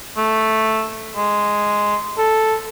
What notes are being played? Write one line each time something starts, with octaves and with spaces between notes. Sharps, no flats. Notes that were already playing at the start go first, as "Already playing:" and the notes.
A3
G#3
A4